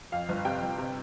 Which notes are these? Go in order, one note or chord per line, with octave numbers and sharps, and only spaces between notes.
F2 F5
G1
C3 G5
G1
C3